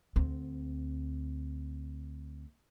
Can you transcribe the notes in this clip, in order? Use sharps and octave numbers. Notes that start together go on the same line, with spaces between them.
D2 C4